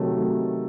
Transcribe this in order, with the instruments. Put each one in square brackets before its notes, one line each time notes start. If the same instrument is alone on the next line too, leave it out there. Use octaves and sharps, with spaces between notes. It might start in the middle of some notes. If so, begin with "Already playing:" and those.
Already playing: [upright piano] C3 D#3 F#3 A3